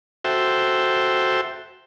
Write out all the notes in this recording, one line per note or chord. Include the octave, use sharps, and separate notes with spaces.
F#4 A4 C5 E5 G5